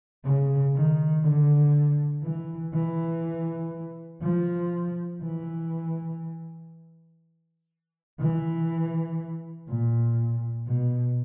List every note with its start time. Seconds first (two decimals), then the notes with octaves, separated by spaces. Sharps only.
0.24 C#3
0.75 D#3
1.23 D3
2.23 E3
2.73 E3
4.22 F3
5.21 E3
8.19 E3
9.68 A#2
10.67 B2